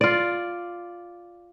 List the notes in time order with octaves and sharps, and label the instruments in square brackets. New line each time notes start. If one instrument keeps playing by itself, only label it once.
[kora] F4 D5